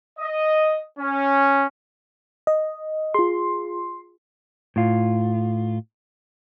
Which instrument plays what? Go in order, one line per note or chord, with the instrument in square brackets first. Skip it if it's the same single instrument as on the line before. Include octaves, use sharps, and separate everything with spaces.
[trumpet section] D#5
C#4
[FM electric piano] D#5
[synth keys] F4 G#4 [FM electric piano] C6
[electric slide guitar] A2 F4